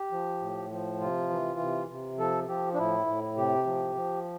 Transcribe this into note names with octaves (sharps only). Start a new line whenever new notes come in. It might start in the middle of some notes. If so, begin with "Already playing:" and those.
Already playing: G4
F3
A2
F3
C3 F4
E3
C3
C3
F3 A4
F3 G4
D4
A2 E4
A2
C3 G4
F3
F3